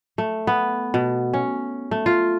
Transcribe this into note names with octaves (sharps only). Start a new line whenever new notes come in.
A3
B3
B2
C#4
A3
F4